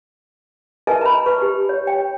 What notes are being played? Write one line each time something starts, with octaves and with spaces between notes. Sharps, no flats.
A#4 B4 D#5 E5 G#5 A5
A#5 B5
B4 C#6
G4
C#5
G5